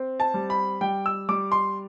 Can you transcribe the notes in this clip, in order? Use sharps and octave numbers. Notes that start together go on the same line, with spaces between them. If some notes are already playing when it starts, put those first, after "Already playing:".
Already playing: C4
A5
G3
B5
G3 G5
E6
G3 D6
C6